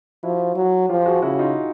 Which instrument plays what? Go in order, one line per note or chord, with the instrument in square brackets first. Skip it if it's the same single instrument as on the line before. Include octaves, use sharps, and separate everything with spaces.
[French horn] F3 [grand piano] E4 F#4
[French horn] F#3
[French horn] F3 [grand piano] F4 G4
[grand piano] F#4 G#4
[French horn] C#3 [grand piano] E4 F#4
[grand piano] D#4 F4